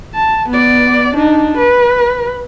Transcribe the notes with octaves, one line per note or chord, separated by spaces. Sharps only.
A5
B3 D5
D4 D#4
B4